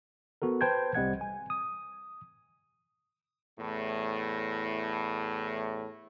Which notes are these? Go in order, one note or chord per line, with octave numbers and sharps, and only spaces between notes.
B3 F#4 A4 A#4
B4 C5 G5 A5 G6 G#6
C2 G3 C4 D#5 F#5 G#6
G#5
D#6
E2 A2